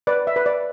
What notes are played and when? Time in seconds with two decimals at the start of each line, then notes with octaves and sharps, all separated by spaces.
0.07 B4 D5
0.27 E5
0.36 B4
0.46 D5